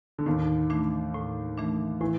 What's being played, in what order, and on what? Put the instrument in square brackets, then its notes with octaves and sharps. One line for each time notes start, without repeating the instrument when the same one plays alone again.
[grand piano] D3
[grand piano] D#2 D#3 [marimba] A2
[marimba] E3 A3 D4
A2
E3 A3 D4
[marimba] A2 [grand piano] E3